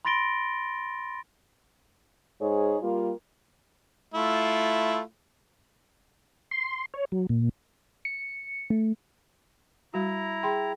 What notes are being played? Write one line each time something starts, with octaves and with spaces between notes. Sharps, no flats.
B5 C6 A6 A#6 D7 G7
G#2 D#4 G#4 C#5
G3 A#3 F4
A3 E4 F4
C6
C#5
F#3
A#2
C#7
A3
G3 E4 F#4 A#5
G#4 G5 B5 C6